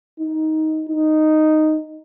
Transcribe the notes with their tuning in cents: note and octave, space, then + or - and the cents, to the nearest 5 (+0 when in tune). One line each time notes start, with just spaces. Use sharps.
D#4 +15
D#4 -5